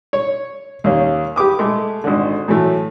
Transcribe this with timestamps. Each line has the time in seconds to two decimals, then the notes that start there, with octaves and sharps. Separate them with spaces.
0.13 C#5
0.84 D#2 A#3 C#4
1.36 G4 B4 D6 D#6
1.59 G#3 A3
2.04 G#1 D3
2.48 A2 E3 F#3 A3